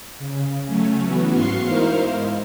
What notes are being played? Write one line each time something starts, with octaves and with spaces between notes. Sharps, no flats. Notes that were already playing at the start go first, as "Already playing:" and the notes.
C#3
F#3 A3 C#4
E3 F#3 B3 F#4
G#2 F5 C6 C#6 C7
D#4 E4 A#4 C5 F5
G#2